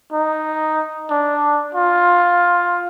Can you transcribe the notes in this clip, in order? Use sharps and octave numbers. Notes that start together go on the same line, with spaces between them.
D#4
D4
F4